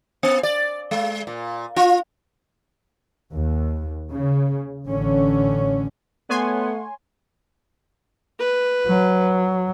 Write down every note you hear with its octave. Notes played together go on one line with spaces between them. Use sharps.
B3
D5
G#3
A#2
F4
D#2
C#3
A1 D3 C#4
A3 B3 C#5 F#5 G#5 C6
B4
F#3